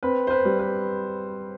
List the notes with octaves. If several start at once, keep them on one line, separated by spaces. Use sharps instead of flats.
C4 B4
C5
B4
G3
B4